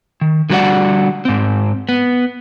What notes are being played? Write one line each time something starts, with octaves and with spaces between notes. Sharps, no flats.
D#3
D3 G3 F#4 A4 D5 F#5
G#2 C4
B3